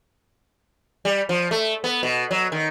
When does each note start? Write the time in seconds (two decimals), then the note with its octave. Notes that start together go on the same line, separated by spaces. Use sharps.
1.05 G3
1.29 F3
1.51 A3
1.84 B3
2.03 B2
2.31 F#3
2.52 D#3